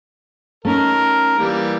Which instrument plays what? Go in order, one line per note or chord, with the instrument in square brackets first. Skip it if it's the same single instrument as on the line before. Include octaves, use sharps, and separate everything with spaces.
[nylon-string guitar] A3 C#4 D#4 [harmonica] A#4
[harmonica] E3 G3 A#3